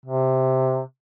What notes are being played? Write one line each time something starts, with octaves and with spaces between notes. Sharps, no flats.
C3